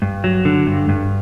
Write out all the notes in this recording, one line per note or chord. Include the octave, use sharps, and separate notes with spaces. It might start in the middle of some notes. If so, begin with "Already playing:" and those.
G2
F#3
D3
G2
G2